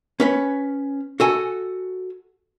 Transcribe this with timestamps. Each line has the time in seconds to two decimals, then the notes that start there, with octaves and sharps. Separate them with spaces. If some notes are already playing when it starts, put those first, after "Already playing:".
0.20 C#4 B4 C#5
1.20 F#4 A4 G#5